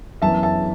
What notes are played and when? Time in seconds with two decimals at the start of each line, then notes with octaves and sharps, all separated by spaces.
0.22 F#2 E3 B3 E5 A5
0.43 E5 A5